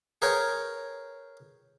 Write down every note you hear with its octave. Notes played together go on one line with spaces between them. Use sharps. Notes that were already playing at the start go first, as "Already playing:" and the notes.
G#4 A#4 B4 C#5 G5